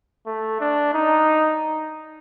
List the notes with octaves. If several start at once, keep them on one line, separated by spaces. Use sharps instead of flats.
A3
D4
D#4